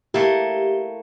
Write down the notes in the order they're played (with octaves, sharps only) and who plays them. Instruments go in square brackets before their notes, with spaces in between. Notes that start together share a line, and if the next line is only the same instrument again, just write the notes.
[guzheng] A3 A#3 E4 [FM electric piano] G4